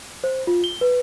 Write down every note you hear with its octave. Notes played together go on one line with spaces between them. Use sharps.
C5
F4
G7
B4